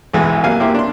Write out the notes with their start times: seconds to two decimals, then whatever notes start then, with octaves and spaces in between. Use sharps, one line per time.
0.14 B1 E2 G#2 E3 G#3
0.44 C3 F#3 A#3 F5 G#5
0.60 A#3 C4 E4 G4
0.75 D4 C6